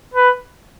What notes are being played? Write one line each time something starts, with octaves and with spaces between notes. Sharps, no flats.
B4